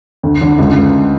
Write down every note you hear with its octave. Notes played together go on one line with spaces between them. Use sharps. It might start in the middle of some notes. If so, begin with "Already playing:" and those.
D2
D3
C#2